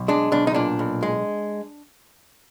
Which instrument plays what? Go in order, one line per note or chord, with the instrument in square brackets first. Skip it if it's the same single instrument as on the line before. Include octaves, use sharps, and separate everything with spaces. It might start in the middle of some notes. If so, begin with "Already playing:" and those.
Already playing: [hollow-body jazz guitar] B1
G#3 D4
B1 D4
D#4
A#2 D4
B1
G#3